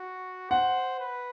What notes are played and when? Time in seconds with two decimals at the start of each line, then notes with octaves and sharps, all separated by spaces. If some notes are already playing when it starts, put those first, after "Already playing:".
Already playing: F#4
0.50 C5 F#5
1.00 B4